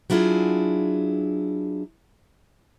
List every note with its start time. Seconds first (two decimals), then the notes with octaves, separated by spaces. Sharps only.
0.10 F#3 D4 E4 F4 G#4